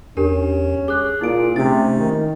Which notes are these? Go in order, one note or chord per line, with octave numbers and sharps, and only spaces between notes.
E2 C#4 D4 G4 A#4
G#4 D6 F#6
A#2 E4 D7
C3 A3 C#4 D#4 A6
D#3